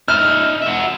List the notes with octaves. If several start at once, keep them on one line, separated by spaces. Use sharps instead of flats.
D#4 E5 F6
F#4 E5